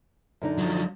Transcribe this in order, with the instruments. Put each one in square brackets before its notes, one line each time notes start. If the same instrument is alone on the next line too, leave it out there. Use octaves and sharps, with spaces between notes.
[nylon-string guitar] F#2 D3 D#4
[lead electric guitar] F3 F#3